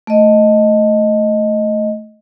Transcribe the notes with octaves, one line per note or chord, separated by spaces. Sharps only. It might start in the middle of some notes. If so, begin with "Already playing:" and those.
A3 D#5